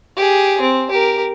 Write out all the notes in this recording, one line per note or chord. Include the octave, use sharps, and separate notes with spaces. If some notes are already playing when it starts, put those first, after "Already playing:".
G4 G#4
C4
G4 A#4